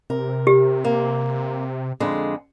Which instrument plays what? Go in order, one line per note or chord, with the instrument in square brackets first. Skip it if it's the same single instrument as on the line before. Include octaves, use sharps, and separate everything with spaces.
[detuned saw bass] C3 [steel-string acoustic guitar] A#4
[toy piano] G4
[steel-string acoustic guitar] A#3
F2 D3 G#3